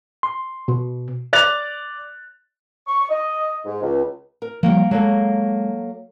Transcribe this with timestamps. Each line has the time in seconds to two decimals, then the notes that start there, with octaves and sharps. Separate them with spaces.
0.23 C6
0.68 B2
1.33 D5 F#6 A6 F7
2.87 C#6
3.09 D#5
3.65 G#2
3.81 C#2
4.42 A#4
4.63 F3 G3 A#3 F#5 G5
4.91 F#3 G#3 A#3 A4